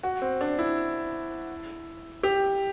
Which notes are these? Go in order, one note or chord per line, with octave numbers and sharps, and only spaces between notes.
F#4
C4
D4
E4
G4